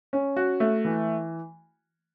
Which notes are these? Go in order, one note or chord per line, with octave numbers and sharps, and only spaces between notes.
C#4
F#4
A3
E3